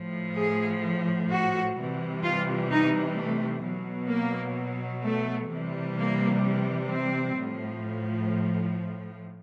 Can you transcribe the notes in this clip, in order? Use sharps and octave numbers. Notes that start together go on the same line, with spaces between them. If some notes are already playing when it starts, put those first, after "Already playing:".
Already playing: A2 F3
G#4
F#4
C3 E3 G3
F4
D#4
A3
B2 F#3
A#3
A3
C3 E3 G3
A#3
C4
A2 F3